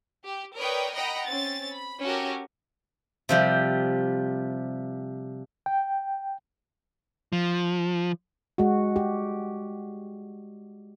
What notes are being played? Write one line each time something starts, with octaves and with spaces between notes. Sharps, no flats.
G4
A#4 B4 C#5 D5 G5 D#6
D#5 F#5 G5 A#5 B5
C4 C#4 A6
B5
C#4 F#4 G4 A4 A#4
C3 F3 G3
G5
F3
G#3 F#4
G4